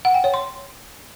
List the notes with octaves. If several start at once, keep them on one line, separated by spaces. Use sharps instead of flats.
F#5
G5
C#5
C6